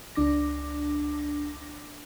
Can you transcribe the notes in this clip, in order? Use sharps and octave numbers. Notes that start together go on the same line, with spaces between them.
C#2 D4 D6 A#6